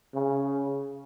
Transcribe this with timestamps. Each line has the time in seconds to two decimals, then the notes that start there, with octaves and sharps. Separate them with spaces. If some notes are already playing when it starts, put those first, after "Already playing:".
0.14 C#3